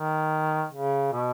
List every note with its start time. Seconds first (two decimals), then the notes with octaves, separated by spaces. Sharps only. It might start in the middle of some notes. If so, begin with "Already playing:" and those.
Already playing: D#3
0.73 C#3
1.13 B2